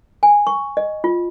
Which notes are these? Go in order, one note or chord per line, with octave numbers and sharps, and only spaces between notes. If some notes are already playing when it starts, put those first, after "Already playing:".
G#5
C#6
D#5
F4